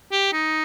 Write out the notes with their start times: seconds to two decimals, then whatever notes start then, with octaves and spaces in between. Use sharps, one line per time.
0.12 G4
0.33 D#4